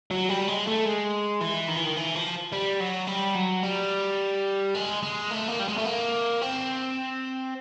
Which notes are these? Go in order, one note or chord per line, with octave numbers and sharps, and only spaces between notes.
F#3
G3
G#3
A3
G#3
E3
D#3
E3
D#3
E3
F3
G3
F#3
G3
F#3
G3
G#3
G#3
A3
A#3
G3
G#3
A3
A#3
C4